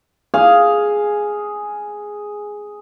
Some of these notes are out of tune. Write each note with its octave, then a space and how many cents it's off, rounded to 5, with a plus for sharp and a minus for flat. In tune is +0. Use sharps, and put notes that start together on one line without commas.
G#4 +0 F5 +0